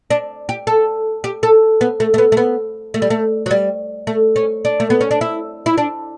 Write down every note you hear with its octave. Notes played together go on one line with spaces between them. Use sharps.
D4
G4
A4
G4
A4
B3
A3
A3
B3
A3
B3
A3
G3
A3
F#3
G3
A3
C#4
D4
A3
B3
C#4
D4
E4
E4
D4